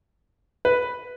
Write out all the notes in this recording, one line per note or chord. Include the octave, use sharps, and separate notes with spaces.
B4